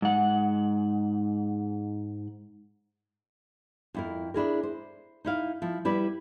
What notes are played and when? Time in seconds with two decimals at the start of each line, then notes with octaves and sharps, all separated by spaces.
0.02 G#2 F#5
3.94 F2 E4 A#4
4.34 D4 E4 G#4 A#4
4.63 C5
5.25 D#4 E4 F5
5.62 F3 E4
5.85 G3 E4 B4 D5